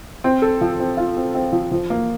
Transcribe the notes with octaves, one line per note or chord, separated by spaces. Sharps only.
C4
A4
F3
C4
F4
C4
C4
F3
F3
A#3